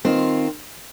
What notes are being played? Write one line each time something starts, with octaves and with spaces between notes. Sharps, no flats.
D#3 C4 F4